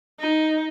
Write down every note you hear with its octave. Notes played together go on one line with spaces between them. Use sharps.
D#4